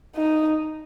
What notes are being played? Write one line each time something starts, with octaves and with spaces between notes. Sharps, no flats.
D#4